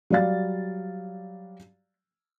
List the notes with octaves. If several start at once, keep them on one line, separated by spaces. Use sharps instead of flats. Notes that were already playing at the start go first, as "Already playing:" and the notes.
F#3 G3 D5 F5 A6